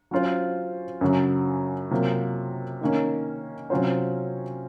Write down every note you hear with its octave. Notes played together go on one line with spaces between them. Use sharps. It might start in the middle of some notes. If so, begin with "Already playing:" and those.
F#3 C#4 F4 C5
F#2 C#3 F#3
C3 F#3 A#3 F4
D#3 A#3 C#4
C3 F#3 C#4 F4 C5